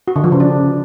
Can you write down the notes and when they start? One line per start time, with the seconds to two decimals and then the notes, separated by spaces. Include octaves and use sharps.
0.08 F#4
0.16 D3
0.24 F3
0.32 C#3
0.40 D4